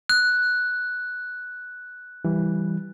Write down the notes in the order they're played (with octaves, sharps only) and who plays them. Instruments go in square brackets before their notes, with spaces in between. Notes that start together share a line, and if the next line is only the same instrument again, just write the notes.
[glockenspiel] F#6
[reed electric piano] E3 G3